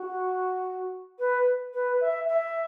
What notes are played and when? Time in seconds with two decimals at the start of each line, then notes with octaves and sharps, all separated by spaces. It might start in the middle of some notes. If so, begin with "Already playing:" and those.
Already playing: F#4
1.19 B4
1.74 B4
2.01 E5
2.29 E5